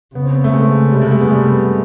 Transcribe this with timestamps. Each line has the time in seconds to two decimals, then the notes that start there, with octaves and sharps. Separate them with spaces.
0.15 C#3 B3
0.25 C4
0.34 B3
0.44 A3
0.53 G#3
0.92 C3 G3
1.02 G#3
1.11 A3
1.21 B3
1.31 C3 G3